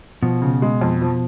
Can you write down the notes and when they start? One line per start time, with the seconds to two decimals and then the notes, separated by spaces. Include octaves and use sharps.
0.22 B2 F3
0.42 C#3
0.62 G#3
0.81 F2
1.01 F3